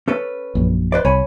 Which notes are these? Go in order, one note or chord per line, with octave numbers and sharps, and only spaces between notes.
C#4 A4 B4
A#1 F#2
B4 C5 D5
C2 C#5 G#5 B5